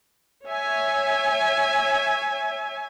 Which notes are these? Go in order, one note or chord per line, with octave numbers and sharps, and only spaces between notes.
C#5 E5 G#5